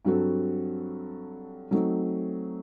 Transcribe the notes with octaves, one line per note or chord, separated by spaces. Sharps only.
G2 F#3 C4 F#4 A4
F#3 A3 C4 D#4